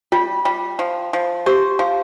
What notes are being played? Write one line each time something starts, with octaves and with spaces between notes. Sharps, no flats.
G3 F4
G3
F3
F3
G4 C5
F3